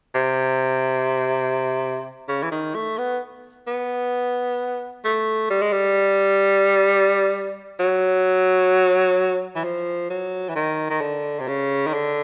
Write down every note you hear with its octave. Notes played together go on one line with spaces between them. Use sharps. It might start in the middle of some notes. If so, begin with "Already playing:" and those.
C3
C#3
E3
D#3
A3
B3
B3
A3
G3
G#3
G3
F#3
E3
F3
F#3
E3
D#3
D#3
D3
C3
C#3
D#3
D3